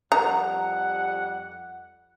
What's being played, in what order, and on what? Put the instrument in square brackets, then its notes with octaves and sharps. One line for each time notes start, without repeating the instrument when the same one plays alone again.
[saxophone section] F2 G3 F#5 [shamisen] A#5